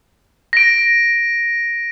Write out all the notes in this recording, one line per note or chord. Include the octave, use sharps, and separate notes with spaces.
A#6 D7